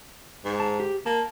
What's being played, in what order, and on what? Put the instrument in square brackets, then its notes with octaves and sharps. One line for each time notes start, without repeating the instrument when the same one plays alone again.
[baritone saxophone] G#2
[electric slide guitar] A5
G4
[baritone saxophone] A#3 [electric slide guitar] A5